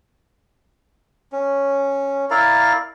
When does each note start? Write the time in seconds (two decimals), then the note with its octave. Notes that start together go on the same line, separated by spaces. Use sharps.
1.32 C#4
2.31 E4 A#4 D5 F5